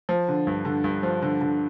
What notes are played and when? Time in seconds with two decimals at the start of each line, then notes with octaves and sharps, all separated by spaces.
0.09 F3
0.28 D3
0.47 G2
0.65 D3
0.84 G2
1.03 F3
1.22 D3
1.41 D3